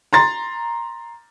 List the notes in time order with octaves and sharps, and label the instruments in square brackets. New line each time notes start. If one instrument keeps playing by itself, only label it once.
[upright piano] A#5 C6 A6